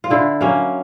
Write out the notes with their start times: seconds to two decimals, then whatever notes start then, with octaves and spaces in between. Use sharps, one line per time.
0.04 F4
0.10 D3 E4
0.41 F#3 A#3 C#4